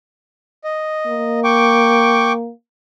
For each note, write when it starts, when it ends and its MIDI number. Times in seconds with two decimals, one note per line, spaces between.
0.64 1.40 75
1.07 2.51 58
1.44 2.33 79
1.44 2.33 85
1.44 2.33 86